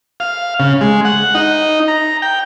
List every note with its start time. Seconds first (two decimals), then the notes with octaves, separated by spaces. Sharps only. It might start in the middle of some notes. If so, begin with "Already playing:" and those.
0.20 F5
0.60 C#3
0.81 G#3
1.05 F#5
1.35 D#4
1.88 A#5
2.22 G5